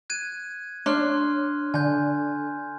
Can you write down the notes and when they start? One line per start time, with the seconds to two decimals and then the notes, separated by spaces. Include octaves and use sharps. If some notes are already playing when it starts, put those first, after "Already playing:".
0.10 F#6 G#6 D#7
0.86 D4 C#5 C6 F6 F#6
1.74 D3 G#5 G6